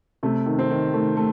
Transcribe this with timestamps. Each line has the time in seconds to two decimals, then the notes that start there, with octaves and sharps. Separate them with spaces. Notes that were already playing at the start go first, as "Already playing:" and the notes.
0.23 C3 A3
0.46 D#3
0.59 C4
0.70 D#3
0.94 D#3 A3
1.17 A3